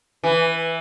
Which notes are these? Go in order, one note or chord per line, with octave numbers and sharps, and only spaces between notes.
E3